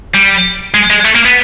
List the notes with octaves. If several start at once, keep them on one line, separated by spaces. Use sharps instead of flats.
G3
G#3
G#3
A3
A#3
B3